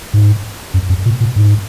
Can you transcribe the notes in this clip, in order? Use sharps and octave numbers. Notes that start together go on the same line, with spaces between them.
G#2
F#2
F#2
A#2
A#2
G#2